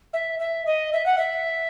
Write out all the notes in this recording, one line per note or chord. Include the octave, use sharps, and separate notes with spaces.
E5
E5
D#5
E5
F#5
E5